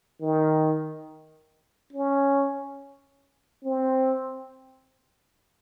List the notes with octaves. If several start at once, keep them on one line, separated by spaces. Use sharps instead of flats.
D#3
C#4
C4